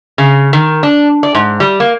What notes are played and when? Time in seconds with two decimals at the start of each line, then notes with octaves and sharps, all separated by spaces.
0.18 C#3
0.53 D#3
0.83 D4
1.23 D5
1.35 G#2
1.60 G3
1.80 A#3